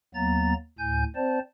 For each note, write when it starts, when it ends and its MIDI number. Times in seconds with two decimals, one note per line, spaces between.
0.15 0.54 39
0.15 0.54 54
0.15 0.54 58
0.15 0.54 59
0.15 0.54 82
0.15 0.54 93
0.79 1.04 38
0.79 1.04 45
0.79 1.04 80
0.79 1.04 91
1.16 1.39 60
1.16 1.39 72
1.16 1.39 74
1.16 1.39 81